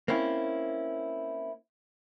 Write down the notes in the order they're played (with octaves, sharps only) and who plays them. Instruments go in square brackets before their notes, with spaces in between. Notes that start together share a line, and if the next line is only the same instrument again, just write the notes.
[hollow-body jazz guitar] A#3 C4 C#4 E4